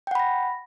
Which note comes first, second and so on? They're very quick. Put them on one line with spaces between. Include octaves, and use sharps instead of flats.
G5 F#5 B5 A#6